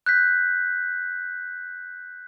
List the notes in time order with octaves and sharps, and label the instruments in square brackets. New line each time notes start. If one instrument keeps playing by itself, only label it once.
[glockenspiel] F#6 G6 B6